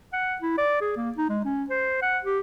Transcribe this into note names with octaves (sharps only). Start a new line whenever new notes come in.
F#5
E4
D5
G#4
A#3
D#4
G#3
C#4
C5
F#5
G4